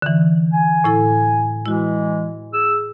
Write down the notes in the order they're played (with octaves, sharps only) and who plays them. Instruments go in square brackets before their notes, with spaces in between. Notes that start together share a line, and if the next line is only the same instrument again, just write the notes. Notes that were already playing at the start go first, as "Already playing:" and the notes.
[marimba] D3 E3
[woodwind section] G#5
[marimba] A2 E4 A4
[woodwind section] E3 G#3 [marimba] E4 F#4
[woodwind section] G#4 E6